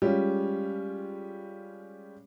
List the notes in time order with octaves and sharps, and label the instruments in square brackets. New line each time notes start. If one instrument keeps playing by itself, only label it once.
[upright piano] G3 G#3 C#4 F4 G4